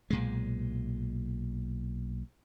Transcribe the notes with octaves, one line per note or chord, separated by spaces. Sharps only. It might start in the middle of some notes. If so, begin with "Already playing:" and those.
B1 A#2 G#3